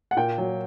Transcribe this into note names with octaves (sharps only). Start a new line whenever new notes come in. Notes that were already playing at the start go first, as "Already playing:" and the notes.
F#5
A#2 G5
F#3